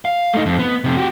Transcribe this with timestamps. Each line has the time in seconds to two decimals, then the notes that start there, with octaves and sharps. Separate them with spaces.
0.05 F5
0.34 A3 D#4
0.46 F2
0.59 B3
0.84 F2 C3
0.97 F#4 G4